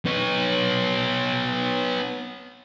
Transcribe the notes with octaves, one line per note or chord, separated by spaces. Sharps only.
B3 C#5